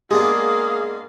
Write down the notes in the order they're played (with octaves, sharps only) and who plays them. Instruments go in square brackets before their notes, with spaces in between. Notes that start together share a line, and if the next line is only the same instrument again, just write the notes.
[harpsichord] G#3 B3 D4 [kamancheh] A#3 F5 [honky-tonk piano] G#4 [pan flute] D#6